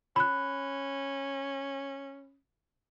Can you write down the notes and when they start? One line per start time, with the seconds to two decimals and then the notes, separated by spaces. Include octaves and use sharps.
0.16 C#4 B5 F#6